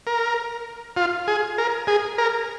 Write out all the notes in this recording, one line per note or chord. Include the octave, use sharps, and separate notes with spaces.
A#4
F4
G#4
A#4
G#4
A#4